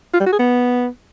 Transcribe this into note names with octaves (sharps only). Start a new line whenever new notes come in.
F4
G3
F#4
G#4
B3